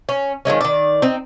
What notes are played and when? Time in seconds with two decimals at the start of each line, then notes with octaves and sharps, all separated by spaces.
0.09 C#4
0.45 D#3 F3 G#3 C#4
0.61 D#3 D5
1.02 C4 D#4